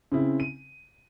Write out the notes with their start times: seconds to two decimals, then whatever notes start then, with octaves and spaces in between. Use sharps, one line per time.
0.12 C#3 C4 E4
0.40 D#7